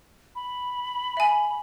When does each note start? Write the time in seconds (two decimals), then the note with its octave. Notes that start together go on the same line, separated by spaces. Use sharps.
0.35 B5
1.17 E5 G#5